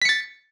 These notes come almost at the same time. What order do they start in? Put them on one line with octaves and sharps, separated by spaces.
B6 C#7 A6